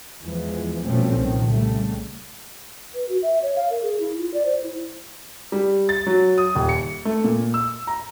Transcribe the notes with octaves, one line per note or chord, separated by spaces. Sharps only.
E2 E3 F3 G#3
B2 F3 G3 A3 C4 C#4
C2 A#2 D#3 F3
C#3 G3 A3
B4
F#4
E5
C#5
F5
A#4
G#4
E4
F4
D5
C5
E4
G3
A6
F#3
D#6
D#1
C#7
A3
A#2
E6
A#5